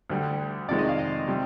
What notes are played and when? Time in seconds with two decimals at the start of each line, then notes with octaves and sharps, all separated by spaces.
0.10 D2 D3 G3
0.69 F2 C3 D#3 G#3 D5
0.79 D#5
0.89 F5
0.99 D#5
1.28 C3 G3